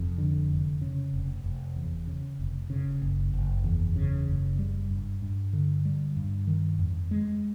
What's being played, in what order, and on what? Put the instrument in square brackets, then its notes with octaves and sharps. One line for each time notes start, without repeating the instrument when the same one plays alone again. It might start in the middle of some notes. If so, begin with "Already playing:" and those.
Already playing: [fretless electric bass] F1 F2
D3
F1
C#3
F1
F1
E2
C#3
F1
C#3
F#1
F#1
E2
C#3
F#1
G3
G2
G2
D3
G3
G2
D#3
F2
G#3